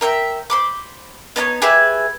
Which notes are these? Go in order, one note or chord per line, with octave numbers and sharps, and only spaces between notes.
A#4 E5 G5
C5 B5 D6
B3 D#4 A#4 C#5
G4 G#4 B4 E5